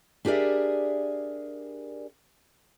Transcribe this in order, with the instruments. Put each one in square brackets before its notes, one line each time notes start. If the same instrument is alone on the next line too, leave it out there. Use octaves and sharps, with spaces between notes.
[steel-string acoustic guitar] D4 G4 G#4 A#4 D5 E5